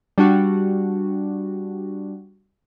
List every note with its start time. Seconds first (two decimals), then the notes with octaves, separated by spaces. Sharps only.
0.18 G3 D4 F#4